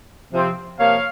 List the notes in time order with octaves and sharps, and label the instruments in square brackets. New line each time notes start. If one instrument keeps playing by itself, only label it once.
[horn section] C3 F3 C4
C3 F3 A#3 C#5 F5